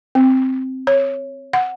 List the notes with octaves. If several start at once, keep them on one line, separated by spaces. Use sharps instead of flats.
C4
C#5
F#5